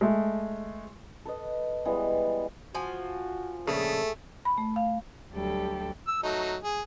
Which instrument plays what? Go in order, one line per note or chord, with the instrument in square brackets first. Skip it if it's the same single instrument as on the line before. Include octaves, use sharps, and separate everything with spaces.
[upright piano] G#3 A3
[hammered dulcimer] A4 B4 D#5
E3 G3 G#3 B3
[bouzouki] F3 G#5 [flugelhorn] F#4
[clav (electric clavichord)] A#1 C#3 [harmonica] A3 [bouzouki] G#4 [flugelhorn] A4
[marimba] B5
A3
F5
[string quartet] D2 F#3 G3 G4 A4 G5
[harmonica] E6
F#3 A3 D#4
G#4